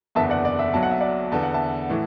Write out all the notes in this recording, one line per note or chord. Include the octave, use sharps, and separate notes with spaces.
F#1 E2 D3 B3 E5 A5
D5 F#5
D5
E5
B1 B2 F#3 A5
F#5
E5
D5 F#5
E2 D3 B3 A5
F#5
E5 A5
A2 E3 A3